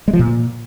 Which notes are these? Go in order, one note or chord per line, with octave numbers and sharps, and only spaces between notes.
G#3
F3
A#2